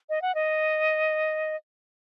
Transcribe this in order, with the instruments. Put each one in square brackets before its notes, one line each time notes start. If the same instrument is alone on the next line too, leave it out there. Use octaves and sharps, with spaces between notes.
[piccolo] D#5
F#5
D#5